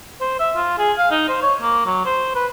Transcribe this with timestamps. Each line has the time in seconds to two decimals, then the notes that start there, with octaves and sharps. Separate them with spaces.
0.21 C5
0.40 E5
0.56 F4
0.79 G#4
0.98 F5
1.11 D#4
1.29 C5
1.42 C#5
1.62 A#3
1.86 F#3
2.05 C5
2.35 B4